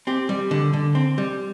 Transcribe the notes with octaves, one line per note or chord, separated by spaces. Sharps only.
C4 G4
G3
D3
D3
C4
G3